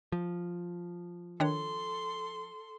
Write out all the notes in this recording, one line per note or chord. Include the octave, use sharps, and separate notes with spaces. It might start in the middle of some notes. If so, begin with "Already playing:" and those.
F3
D#3 D4 A4 C#5 C6